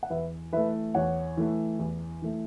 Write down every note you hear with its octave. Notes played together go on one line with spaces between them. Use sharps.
F#5
E2 B4 E5
E3 A3 B4 E5
E2 C#5 F#5
E3 A3
E2
E3 A3